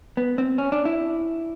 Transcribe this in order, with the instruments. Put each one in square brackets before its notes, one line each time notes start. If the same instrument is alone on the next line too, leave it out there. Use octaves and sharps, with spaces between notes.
[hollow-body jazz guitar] B3
C4
C#4
D4
E4